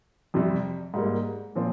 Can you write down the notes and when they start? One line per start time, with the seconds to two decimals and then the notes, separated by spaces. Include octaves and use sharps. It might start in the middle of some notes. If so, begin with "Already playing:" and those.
0.34 F2 C3 G3
0.94 G#2 G3 A#3
1.55 A#2 F3 C4